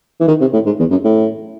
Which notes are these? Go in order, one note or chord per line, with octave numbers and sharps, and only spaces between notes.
E3
D#3
C3
A2
G#2
E2
F#2
A2